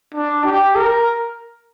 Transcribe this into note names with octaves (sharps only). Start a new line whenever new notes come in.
D4
G4
A#4